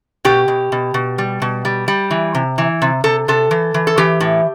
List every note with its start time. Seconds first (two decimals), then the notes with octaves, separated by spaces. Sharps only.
0.25 B2 G4
0.48 B2
0.72 B2
0.94 B2
1.18 G3
1.42 B2
1.65 G3
1.88 G3
2.11 E3
2.35 C3
2.58 E3
2.82 C3
3.04 C3 A4
3.28 C3 A4
3.51 E3
3.74 E3
3.87 A4
3.98 E3 G4
4.20 A2